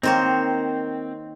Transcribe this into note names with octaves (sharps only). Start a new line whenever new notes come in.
D#3 A#3 C4 A#4 C5 C#5